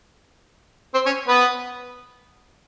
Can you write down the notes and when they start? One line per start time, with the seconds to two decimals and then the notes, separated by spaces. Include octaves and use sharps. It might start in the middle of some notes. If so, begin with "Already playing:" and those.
0.94 C4 C5
1.06 C#4 C#5
1.28 B3 B4